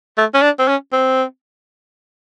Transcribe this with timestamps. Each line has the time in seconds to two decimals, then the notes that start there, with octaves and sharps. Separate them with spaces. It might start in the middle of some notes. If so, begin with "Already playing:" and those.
0.18 A3
0.34 C#4
0.42 D4
0.59 C4
0.68 C#4
0.93 C4